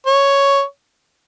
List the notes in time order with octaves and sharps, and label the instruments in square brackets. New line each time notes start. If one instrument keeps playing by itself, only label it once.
[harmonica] C#5